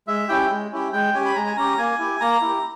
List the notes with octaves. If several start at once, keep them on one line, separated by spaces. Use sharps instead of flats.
G#3 E5
C#4 E4 G4 G5
G#3
C#4 E4 G4
G#3 G5
C#4 G4 G#5
B5
G#3 A#5
G#5
C#4 G4 A#5
A#3 G#5
E4 G4
A#3 A#5
E4 G4